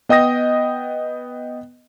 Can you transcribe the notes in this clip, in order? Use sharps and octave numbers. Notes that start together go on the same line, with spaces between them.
B3 D#5 G5 D#6 A#6